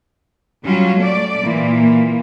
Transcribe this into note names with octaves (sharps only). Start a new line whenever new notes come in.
F#3 G3 C#4 F4
A3 D5
A#2 E3 A#3